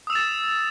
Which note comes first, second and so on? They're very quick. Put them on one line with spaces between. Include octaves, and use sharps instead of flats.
D#6 E6 E7 A6